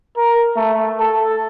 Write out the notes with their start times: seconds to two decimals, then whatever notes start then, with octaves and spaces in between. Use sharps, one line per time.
0.16 A#4
0.56 A3
1.00 A4